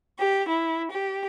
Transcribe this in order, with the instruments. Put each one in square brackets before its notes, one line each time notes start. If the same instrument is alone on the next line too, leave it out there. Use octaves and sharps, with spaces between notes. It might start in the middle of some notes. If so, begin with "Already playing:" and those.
[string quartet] G4
E4
G4